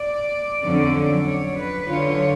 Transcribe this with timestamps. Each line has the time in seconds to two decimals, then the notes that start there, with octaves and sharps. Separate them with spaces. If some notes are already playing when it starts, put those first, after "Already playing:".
Already playing: D5
0.63 F2 D3 F#3 C#4
1.26 C#5
1.58 B4
1.88 D3 F#3 C#4 F4 C#5